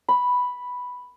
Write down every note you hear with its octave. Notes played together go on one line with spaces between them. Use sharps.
B5